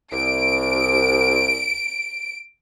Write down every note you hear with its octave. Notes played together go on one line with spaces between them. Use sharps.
C2 D7